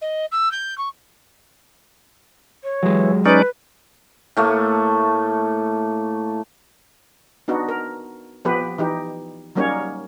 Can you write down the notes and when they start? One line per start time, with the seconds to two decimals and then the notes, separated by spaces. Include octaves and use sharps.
0.01 D#5
0.31 E6
0.51 G6
0.78 C#6
2.64 C#5
2.83 E3 F#3 G#3
3.26 C#4 D#4 B4 D5
4.37 A2 A3 A#3
7.48 B3 D4 D#4 F#4
7.69 A#4
8.45 F3 B3 G4 B4
8.78 E3 D#4 G4
9.55 F#3 G3 A#3 C#4 D#4 C#5